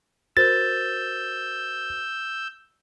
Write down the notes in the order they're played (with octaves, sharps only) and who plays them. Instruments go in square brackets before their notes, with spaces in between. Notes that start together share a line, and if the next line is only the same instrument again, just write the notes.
[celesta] F#4 A#4 C5 [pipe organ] E6 G6 [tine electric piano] A6